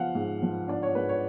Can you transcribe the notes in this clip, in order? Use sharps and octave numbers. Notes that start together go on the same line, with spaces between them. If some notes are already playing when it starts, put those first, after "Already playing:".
Already playing: F3 B3 F5 F#5
G#2
F3
D4 D5
C#5
G#2 B4
C#5